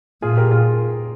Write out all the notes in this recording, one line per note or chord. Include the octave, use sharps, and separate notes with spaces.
A#2 F4 G#4
G4 A#4
F4 G#4